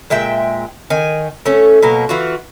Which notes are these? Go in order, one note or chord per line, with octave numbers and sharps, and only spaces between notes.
A#2 G#3 E5 G5
D#3 G#5
A3 C#4
B2 F#3 A#3
E3 F4 F#4